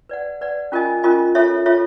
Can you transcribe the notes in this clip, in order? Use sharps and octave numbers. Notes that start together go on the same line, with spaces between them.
B4 D5 F#5
B4 D5 F#5
C#4 F4 A#4 D#5 G#5
C#4 F4 A#4 D#5 G#5
F4 A4 C#5 E5
F4 A4 C#5 E5